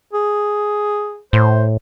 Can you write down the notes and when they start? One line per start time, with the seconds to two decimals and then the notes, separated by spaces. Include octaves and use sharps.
0.13 G#4
1.33 A2 C5